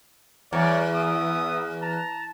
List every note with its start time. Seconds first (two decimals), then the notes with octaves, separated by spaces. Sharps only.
0.53 E2 G3 C#5 D5
0.94 B3 E5 D#6
1.82 A5 A#5